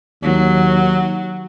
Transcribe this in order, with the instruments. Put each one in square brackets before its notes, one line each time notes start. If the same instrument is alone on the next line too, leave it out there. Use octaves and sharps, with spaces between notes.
[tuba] D#2 [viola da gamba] F#3